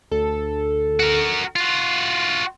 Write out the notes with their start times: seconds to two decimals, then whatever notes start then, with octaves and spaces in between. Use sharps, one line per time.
0.11 D2 A4
1.00 F#4 A#4
1.56 F4 F#4 C6